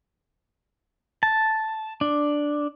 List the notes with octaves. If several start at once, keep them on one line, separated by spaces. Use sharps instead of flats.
A5
D4